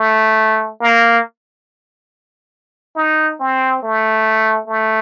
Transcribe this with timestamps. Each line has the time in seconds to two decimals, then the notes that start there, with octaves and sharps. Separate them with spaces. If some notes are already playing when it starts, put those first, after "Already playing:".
Already playing: A3
0.80 A#3
2.95 D#4
3.40 C4
3.83 A3
4.68 A3